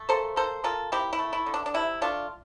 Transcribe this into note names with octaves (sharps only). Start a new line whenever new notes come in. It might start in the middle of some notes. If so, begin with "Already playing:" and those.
Already playing: A3
A#3 A4 C5
A#3 A4 C5
A#3 F4 A4
C4 E4 G4
E4
A3
E4
D3
D4
D4
C3 E4
A3 D4 F4